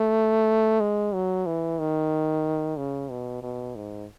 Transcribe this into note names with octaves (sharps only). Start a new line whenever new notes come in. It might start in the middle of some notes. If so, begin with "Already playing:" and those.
Already playing: A3
G#3
F#3
E3
D#3
C#3
B2
B2
G#2